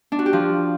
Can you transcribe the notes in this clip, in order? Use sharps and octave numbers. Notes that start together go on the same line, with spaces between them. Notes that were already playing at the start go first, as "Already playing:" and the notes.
D4
F#4
G4
F3